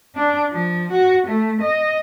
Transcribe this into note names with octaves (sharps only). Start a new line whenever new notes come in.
D4
F3
F#4
A3
D#5